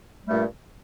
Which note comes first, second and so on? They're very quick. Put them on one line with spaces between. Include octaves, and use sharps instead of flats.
G3 A3 G2 A#2